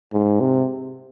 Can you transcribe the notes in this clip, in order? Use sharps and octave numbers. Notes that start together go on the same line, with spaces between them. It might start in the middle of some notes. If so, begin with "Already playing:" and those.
G#2
C3